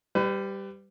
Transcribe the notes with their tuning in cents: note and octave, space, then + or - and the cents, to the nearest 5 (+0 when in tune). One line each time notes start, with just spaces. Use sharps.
G3 +0 B4 +35